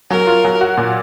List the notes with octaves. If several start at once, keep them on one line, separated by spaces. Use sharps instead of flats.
F#3 A#4
F4
F#3
F#4
A#2